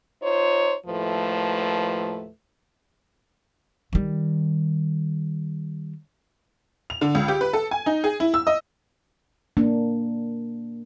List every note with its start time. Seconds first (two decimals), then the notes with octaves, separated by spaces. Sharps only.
0.23 D#4 F4 C5 C#5
0.87 D#2 A2 F3 A3 B4
3.93 D#3 G3
6.90 F7
7.01 D3
7.15 C#2
7.28 G4
7.41 B4
7.53 A4
7.71 G#5
7.86 D#4
8.04 G#4
8.20 E4
8.34 E6
8.47 D#5
9.57 A#3 D4